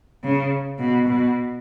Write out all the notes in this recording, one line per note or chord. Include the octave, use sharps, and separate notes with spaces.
C#3
B2
B2